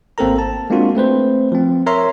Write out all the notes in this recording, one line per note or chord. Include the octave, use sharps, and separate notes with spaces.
G#1 A#3 C4 A4 A#4 A#5
A5
G#3 A#3 C4 D4 F4 F#4
A3 C4 B4 C5
F3 C4
A#4 C#5 E5 A#5 C6